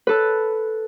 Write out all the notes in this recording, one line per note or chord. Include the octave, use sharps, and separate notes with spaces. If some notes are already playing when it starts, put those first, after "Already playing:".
A4 B4